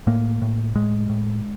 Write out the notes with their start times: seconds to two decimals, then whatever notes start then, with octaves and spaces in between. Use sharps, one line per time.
0.07 A2 A#3
0.42 A2
0.75 A2 G#3
1.09 A2